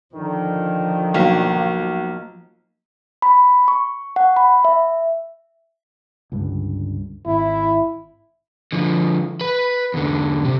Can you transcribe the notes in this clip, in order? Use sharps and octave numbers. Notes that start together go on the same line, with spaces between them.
D3 D#3 F3
B1 A#3
B5
C#6
F#5
B5
E5
C#2 G2 D3
G#1 E4
D3 F3
B4 B5
E2 D3
C3